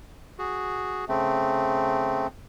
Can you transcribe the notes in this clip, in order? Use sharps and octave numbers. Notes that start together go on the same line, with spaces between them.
F#4 G#4
C#3 A3 C4